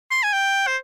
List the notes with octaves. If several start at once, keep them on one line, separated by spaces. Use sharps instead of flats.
C6
G#5
G5
C5